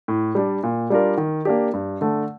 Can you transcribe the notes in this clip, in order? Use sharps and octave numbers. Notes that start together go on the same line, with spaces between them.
A2
G3 D4
A#2
G3 D4 F4 A#4
D#3
A#3 D4 G4
G2
D3 A3